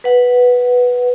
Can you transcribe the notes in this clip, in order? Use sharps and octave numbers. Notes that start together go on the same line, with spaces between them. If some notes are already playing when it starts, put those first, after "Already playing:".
B4 F#5